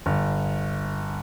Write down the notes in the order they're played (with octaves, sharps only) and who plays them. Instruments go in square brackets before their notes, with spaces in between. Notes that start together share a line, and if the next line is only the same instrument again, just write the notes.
[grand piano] G1